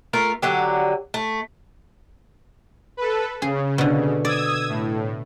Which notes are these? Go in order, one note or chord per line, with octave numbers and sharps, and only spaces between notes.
A3 F4 A#4
D3 F#3 G4
A3
A4 B4
C#3 G#4
B2 D3
D5 D#6 E6 G#6
A2